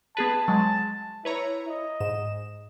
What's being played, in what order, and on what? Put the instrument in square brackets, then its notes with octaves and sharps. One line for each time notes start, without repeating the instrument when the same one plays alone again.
[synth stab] B3 G#4 B4 [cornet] A5
[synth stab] F#3 G#3
[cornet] E4 [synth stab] B4 C#5 A#5
[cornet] D#5
[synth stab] G#2 E7